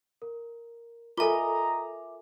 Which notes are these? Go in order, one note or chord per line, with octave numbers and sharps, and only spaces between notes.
A#4
F4 A4 A#4 D#5 E5 G#5 A#5 D6